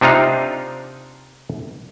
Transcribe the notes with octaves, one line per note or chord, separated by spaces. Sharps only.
C3 D4 D#4 F4 F5